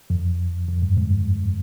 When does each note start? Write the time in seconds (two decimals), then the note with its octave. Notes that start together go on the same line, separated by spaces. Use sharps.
0.10 F2
0.68 F2
0.82 G2
0.97 G#2